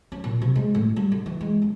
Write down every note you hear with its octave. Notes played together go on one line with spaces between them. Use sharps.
C#4
A#2
C3
G#3
A2
G3
D3
E3
G#3
G1